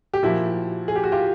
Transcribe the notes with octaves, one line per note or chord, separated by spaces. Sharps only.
G4
A#2 F3 E4 F#4
G#4
G4
F#4
F4 G4